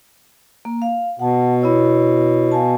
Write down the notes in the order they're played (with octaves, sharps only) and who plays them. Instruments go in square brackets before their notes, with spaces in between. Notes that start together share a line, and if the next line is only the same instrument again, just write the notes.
[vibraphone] A#3
F5
[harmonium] B2 [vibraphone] F#5 A5
[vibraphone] B3 E4 C#5
F5 G#5 A5